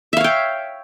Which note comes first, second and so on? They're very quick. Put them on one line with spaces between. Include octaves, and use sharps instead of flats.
E5 F5 C#5 G5